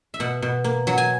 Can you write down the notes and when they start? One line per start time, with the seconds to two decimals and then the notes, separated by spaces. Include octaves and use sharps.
0.14 E5
0.20 B2 F#5
0.42 B2
0.64 A#3
0.87 F#3
0.98 G#5